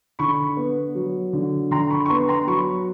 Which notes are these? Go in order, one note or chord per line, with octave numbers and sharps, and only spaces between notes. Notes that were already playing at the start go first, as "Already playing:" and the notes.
D3 B5 C#6
B3
F#3
D3
D3 A#5 C6
B5 C#6
C#6
B3 A#5 C6
A#5 C6
F#3 B5 C#6